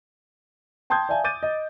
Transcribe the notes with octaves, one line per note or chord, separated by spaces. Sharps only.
G5 A5 C6 D#6 G6 G#6
D5 E5 F5 G#5 A5
D6 G6 A6 D#7
D#5